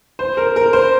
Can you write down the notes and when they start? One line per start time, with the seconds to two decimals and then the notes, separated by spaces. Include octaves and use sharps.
0.19 C5
0.37 A#4
0.56 A#4
0.73 C5